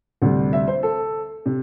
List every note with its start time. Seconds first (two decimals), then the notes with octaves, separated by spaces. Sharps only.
0.22 D2 C3 G3
0.53 E5
0.68 C5
0.83 A4
1.46 C3